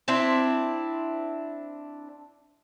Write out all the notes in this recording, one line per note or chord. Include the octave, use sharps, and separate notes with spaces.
C4 D4 E4